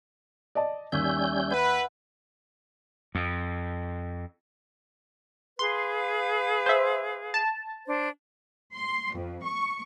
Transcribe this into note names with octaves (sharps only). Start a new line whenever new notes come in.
D5 D#5 A5
D#2 G3 C#4 E5 G#5 G6
B4 F#5
F2
G#4 B4 F5 C6
C5 E5
A5
D4 C5
C6
F2
C#6